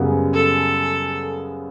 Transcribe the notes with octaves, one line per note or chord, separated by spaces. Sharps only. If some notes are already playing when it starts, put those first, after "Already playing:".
Already playing: F#2 C#3 G3 B3
A4